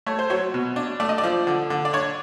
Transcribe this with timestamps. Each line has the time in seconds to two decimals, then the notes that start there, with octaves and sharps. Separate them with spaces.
0.06 A3 C#5
0.19 C5
0.30 F#3 C#5
0.54 B2
0.76 D4
1.00 A3 D5
1.09 D#5
1.18 D5
1.23 F3
1.47 D3
1.70 D3
1.85 D5
1.93 D4 C#5